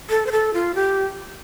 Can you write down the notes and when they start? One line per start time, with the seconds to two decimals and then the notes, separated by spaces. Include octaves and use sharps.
0.10 A4
0.26 C5
0.32 A4
0.54 F4
0.75 G4